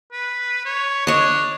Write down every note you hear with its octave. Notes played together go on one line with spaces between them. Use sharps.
B4
C#5
D4 C#5 D#5